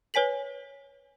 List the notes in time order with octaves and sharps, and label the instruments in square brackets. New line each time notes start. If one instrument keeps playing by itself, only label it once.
[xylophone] B4 C#5 G#5 B6 F#7